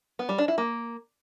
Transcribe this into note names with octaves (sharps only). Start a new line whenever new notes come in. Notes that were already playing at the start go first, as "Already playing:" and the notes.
B3
G3
D4
E4
A#3